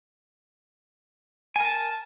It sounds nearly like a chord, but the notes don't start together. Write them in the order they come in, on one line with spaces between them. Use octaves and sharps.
G#5 A#4 A5